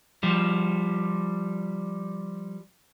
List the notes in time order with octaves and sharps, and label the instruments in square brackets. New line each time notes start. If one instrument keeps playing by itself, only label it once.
[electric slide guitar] F3 G3